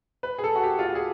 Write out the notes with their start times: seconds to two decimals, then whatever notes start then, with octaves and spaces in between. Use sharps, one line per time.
0.23 B4
0.39 G#4
0.44 A4
0.55 F#4
0.63 G4
0.79 F4
0.85 F#4
0.95 G#4